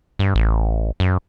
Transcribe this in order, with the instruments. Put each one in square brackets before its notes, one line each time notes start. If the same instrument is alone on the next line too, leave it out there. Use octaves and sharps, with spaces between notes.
[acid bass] G2
A1
F#2